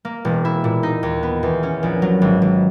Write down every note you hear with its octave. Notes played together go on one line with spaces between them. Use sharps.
A#3
E1
E4
A#2
D#4
D#2
B3
E2
C#4
A#1
F#3
G#1
G#1